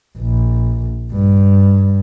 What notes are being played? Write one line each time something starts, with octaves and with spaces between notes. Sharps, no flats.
A#1
G2